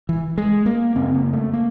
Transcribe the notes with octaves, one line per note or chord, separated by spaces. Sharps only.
E3
G#3
A#3
F#2 C#3 C4
A#3
A3
A#3